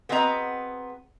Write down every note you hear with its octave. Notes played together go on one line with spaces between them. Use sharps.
B3 C4 F#4 G#4 D#5 A#5